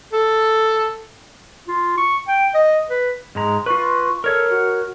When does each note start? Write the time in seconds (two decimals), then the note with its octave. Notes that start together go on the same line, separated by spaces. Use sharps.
0.13 A4
1.68 F4
1.98 C#6
2.28 G5
2.55 D#5
2.90 B4
3.35 G#2 G#3 A#5
3.66 F4 B4 C#6
4.24 A4 A#4 C#5
4.50 F#4